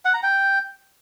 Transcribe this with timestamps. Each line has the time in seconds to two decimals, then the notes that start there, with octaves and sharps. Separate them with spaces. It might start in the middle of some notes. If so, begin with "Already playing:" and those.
0.05 F#5
0.14 A#5
0.23 G5